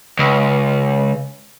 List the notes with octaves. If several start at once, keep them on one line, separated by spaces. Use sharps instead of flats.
C#2